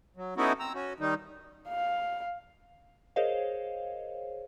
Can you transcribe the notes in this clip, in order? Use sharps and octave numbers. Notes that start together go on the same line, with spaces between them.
F#3
A3 B3 C#4 D#4 E4 F#4
C4 A#5 E6
C#4 F#4
D#3 G3 D#4
F5
G#4 A#4 C5 C#5 D#5 F5